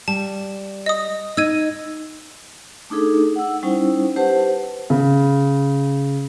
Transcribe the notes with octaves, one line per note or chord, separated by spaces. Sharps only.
G3 A5
D#5 D#6
D#4 E6 G#6 D#7
A3 D4 D#4 G#4 A4
F#5 E6
G3 C#4 D#4 E4 C5
G4 B4 C5 F#5 A5
C#3